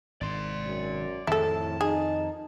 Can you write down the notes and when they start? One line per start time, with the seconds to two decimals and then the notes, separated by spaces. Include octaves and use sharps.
0.21 G#1 G#2 D5 C6
0.65 F#2
1.27 F2 A2 D#3 F3 E4 A4 A5
1.81 D#4 G#4